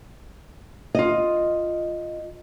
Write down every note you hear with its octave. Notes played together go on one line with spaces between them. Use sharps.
F4 D#5